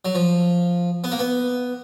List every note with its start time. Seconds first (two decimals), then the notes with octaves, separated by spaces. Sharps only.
0.05 F#3
0.15 F3
1.04 B3
1.12 A#3
1.19 B3